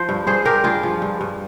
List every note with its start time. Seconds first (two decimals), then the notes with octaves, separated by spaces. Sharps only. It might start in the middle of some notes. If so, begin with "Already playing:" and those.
Already playing: F3 C5
0.09 G2
0.27 G2 G#4 C5
0.45 G2 G4 A#4
0.64 G2 F4 G#4
0.83 F3
1.02 G2
1.21 G2